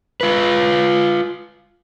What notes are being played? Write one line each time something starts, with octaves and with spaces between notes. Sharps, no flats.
F4 B4